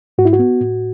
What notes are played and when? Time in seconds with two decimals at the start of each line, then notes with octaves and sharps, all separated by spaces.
0.18 G#2 F#4
0.25 E4
0.33 F#4
0.39 B3
0.61 A2